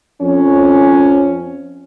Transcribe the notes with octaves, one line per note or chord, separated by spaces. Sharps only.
F2 C#4